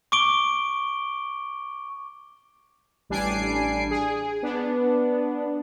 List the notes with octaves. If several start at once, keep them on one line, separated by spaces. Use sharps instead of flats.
C#6 D6 D7 G7
A1 G3 D4 G#5 C7 D7
G#4
B3 D4